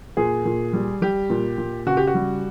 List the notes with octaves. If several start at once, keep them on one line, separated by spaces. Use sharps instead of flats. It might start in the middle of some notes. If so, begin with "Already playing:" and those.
A#2 G#4
A#2
G3
G3 G4
A#2
A#2
C#3 F#4
G4
F#4
G3